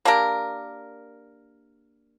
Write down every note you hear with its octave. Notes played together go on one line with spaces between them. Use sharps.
A#3 D4 G4 A#4